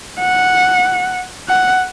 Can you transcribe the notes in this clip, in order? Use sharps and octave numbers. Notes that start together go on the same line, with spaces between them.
F#5
F#5